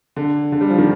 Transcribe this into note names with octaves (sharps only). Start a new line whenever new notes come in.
D3
D3
G3
F3
D#3